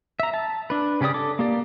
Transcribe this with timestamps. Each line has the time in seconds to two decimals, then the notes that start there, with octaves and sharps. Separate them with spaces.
0.20 E5 A#5
0.34 A5
0.70 D4 B4
1.01 C#3 C#4 G4 D5 D#6
1.14 A4 D6
1.39 A#3 G4 D5